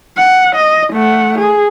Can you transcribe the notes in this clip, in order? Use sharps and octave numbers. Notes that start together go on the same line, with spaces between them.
F#5
D#5
A3 F#5
G#4